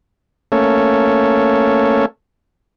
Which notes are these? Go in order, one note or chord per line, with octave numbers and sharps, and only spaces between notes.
A3 A#3 C#4 A4 C#5